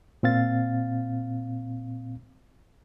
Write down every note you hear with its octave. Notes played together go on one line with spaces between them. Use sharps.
A#2 C4 F5 A6